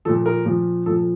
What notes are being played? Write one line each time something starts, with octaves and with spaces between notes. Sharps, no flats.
A#2 F3 A4
A#4
A#2 F3
A#2 F3 A4